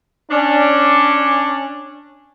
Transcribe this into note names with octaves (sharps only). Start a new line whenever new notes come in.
C#4 D4